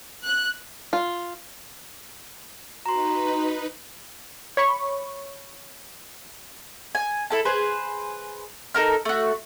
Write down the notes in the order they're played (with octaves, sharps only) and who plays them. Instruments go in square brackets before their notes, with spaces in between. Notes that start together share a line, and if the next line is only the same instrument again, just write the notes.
[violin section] F#6
[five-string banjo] F4
[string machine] D#4 B4 [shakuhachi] F#4 [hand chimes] A#5 C6
[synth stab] C#5 B5 C#6
[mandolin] G#5
E4 A4 A5
G#4 B4 C5
D#4 A4 A#4 F6
A3 F#4